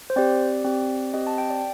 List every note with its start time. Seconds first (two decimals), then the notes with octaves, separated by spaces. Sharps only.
0.10 C5
0.16 C4 G4 D5
0.65 C4 G4
1.13 C4 G4 D#5
1.27 A5
1.38 G5
1.50 D5